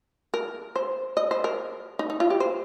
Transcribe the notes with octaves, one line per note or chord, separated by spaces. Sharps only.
A#4
C5
D#5
C5
A#4
D#4
D#4
F4
G4
C5